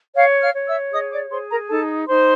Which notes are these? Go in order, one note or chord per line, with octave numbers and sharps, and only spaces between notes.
C#5 F5 F6
F5 F6
C#5
E5 E6
G#4 D#5 D#6
D5 D6
G#4 C5 C6
A#4 A#5
D#4 A4 A5
D#4 C5 C6